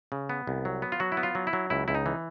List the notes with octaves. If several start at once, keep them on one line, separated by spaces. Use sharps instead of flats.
C#3
B3
C2
F#3
B3
F4
F#3 F#4
E4
B3
F4
F#3
E4
F#3
C#2 E4
C#2 E4
D#4
E3